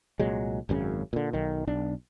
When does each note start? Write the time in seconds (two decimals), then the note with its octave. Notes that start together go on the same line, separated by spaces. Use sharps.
0.20 C2 A#2 F#3 G#3
0.69 G#1 F#2 A#2 C#3
1.13 A#2 D3
1.33 B1 D#3
1.67 B1 D4